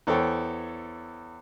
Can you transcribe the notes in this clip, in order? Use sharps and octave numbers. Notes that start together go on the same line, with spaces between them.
E2 A4 C5 C#5 G5